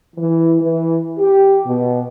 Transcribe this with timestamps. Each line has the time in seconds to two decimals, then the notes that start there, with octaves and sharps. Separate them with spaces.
0.16 E3
0.62 E3
1.18 G4
1.65 B2